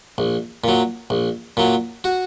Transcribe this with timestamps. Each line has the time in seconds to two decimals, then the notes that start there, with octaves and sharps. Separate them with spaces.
0.18 A#1
0.64 A#2 F#3
1.10 A#1
1.57 A#2 F#3
2.04 F#4